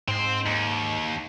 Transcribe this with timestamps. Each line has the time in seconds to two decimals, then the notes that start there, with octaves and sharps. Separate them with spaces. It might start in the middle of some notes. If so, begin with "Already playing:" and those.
0.08 G#2 C4 C6
0.46 D#2